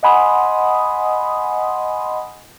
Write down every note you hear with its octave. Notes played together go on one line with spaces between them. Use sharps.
D#5 F#5 G#5 B5 C6 D#6